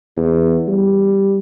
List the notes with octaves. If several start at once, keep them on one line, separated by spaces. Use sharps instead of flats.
E2
G3